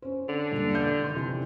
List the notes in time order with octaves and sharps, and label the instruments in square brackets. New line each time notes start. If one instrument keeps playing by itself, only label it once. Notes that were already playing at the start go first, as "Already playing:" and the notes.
[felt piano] C#4 C5
[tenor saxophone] D3
[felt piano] E1 G2 A#2
G6
D#3 C6
C3 E3